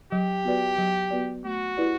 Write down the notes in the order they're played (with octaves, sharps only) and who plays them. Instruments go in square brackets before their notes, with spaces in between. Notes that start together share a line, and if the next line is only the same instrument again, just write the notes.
[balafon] F#3 [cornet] G4
[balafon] B3 F#4 B4 D5
F#3
B3 F#4 B4 D5
[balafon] A3 [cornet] F#4
[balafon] E4 G4 B4 D5